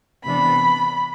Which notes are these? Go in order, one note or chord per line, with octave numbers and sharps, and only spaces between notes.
C3 E3 B3 D4 B5